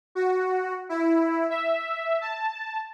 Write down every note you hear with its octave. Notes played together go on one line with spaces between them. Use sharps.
F#4
E4
E5
A5